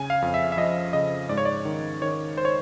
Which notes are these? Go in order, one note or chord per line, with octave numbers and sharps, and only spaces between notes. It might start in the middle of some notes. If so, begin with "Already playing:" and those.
Already playing: C#3 G#5
F5
F2
E5
E5
F3 D#5
C#3 D#5
G#2 D5
C#5
D5
D#3
D#3 C#5
C5
C#5